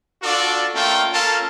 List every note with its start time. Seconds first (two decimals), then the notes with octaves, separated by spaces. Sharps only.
0.23 D4 F4 F#4 A4 D5
0.75 A3 A#3 C#4 F4 F5 G5
1.13 A#3 C#4 F4 A4 F5 A5